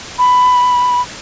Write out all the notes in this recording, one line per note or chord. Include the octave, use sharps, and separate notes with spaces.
B5